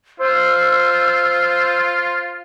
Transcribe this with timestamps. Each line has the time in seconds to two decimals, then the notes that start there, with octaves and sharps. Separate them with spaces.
0.20 F4 C5 E6